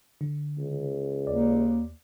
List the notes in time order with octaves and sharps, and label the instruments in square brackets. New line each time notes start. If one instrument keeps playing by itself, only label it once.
[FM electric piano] D3
[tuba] C#2
[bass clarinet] D#2 [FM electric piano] D5